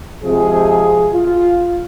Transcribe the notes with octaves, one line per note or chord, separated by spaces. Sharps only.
C3 F3 G#3 G#4
F4